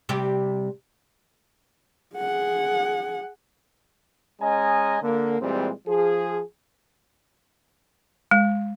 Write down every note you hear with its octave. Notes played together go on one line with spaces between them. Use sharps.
C3 G3 G4
G#4 F#5
G#3 C#4 D#5 G#5 A#5
D3 A#3
A#2 E3 G3 G#3 C4
F3 G#4
G#3